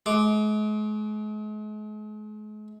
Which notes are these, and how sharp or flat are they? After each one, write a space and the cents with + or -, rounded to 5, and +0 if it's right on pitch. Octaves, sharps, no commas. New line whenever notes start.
G#3 +40 D6 +0